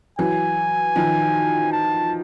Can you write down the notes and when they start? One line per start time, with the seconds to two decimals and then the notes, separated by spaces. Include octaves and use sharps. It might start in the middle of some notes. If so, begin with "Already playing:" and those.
0.19 E3 F#3 G#5
0.96 D#3 F3
1.72 A5